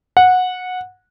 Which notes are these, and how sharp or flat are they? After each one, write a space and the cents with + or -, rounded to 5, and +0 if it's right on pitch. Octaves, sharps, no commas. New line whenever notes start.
F#5 -15